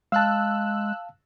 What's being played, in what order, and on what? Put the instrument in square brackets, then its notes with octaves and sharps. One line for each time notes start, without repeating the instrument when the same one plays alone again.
[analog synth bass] G#3 [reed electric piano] F5 A5 [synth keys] E6 F#6